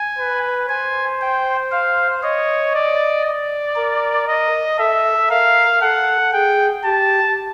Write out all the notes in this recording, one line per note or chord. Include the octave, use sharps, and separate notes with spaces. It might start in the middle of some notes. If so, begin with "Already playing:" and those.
Already playing: G#5
B4
C5 G#5
G5
F5
C#5 D#5
D5
D5
A#4
D#5
A4 E5
A#4 F5
A4 F#5
G#4 G5
G4 A5